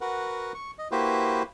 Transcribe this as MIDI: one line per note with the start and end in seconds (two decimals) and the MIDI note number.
0.01 0.52 66
0.01 0.52 70
0.01 0.52 71
0.01 0.52 78
0.54 0.71 85
0.79 0.88 75
0.91 1.43 58
0.91 1.43 64
0.91 1.43 66
0.91 1.43 67
0.91 1.43 71
0.91 1.43 72